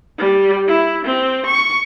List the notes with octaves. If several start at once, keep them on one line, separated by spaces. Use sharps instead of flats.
G3
E4
C4
C#6